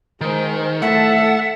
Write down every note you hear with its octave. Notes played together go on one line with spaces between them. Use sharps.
D#3 G#3 C5
A2 A3 A4 E5 F#5 A5